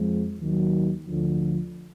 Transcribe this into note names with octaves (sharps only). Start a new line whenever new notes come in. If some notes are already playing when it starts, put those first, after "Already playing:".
Already playing: F2 F3 G#3
D#2 D#3 F#3
D2 D3 F3